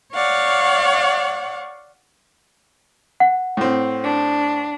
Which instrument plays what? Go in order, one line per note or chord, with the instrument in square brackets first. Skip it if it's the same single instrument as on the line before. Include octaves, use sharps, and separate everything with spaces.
[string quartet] C#5 D5 F5 F#5
[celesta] F#5
[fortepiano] A2 C4
[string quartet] D4